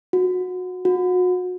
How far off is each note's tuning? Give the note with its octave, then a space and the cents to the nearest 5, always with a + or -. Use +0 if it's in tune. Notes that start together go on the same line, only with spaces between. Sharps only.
F#4 -25
F#4 -35